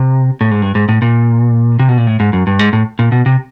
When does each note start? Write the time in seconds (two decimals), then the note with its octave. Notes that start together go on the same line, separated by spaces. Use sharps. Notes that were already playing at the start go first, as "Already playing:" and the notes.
Already playing: C3
0.41 A2
0.51 G#2
0.62 G2
0.75 G#2
0.89 A2
1.02 A#2
1.80 C3
1.89 B2
1.97 A#2
2.07 A2
2.20 G#2
2.33 F#2
2.47 G2
2.59 G#2
2.73 A2
2.99 A#2
3.12 B2
3.26 C3